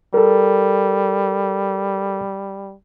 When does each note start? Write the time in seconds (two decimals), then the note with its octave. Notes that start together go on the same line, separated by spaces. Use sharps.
0.14 G3 A4 A#4